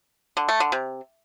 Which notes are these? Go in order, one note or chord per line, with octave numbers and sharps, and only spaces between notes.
D3
A3
D3
C3